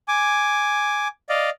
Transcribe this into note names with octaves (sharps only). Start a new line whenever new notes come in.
G#5 D6
D5 D#5 F5